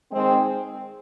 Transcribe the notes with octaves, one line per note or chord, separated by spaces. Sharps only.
D#3 G#3 C4